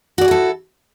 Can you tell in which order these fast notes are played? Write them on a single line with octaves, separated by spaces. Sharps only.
F#4 D5 G#4 E4 A4